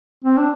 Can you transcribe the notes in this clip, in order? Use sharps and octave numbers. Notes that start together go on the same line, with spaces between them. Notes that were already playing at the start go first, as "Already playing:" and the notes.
C4
D4